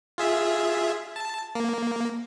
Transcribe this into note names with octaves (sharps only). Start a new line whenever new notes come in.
F4 G#4 E5
A5
A#3